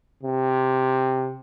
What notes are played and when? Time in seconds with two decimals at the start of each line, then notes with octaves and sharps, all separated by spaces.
0.23 C3